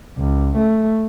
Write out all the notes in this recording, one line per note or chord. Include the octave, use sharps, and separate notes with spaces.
C#2
A3